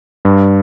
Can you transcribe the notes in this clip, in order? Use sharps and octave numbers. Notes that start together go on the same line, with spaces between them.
G2